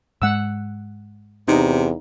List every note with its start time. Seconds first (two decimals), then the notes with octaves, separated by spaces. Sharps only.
0.22 G#2 G#3 F#5 E6
1.48 E2 C3 D#4